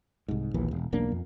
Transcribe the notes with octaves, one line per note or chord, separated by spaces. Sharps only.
C2 G#2
A#1 D#2 E3
E1
E1 B1 A#3 D4
F2